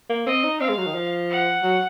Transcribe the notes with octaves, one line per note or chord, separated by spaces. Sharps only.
A#3
C4 D#5
D#4
C4 F5
G#3
F#3
D#3
F3
F#5
F#3